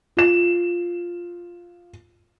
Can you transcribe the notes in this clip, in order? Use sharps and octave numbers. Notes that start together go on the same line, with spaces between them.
F4 E7